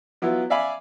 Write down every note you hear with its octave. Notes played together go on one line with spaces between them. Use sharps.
F#3 B3 E4 F4
D5 E5 F5 G#5 B5